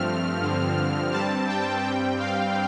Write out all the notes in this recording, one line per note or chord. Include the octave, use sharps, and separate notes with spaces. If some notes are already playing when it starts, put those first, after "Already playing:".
Already playing: G2 F3 A3 C4 F6
G2 D3 F3 C4
G2 G3 C4 A5
G5
G2 G3 C4 G5
F5